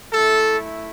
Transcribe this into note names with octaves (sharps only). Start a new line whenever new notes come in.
A3 E4 A4